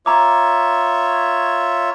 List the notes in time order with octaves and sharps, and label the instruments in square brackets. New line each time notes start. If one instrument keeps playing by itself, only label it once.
[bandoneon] F4 C#5 E5 [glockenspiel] A#5 D6